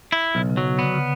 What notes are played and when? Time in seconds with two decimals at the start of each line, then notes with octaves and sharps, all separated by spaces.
0.12 E4
0.34 B1 C#3
0.49 C#3
0.57 F#3
0.64 C#3
0.79 D3 B3
0.94 C#3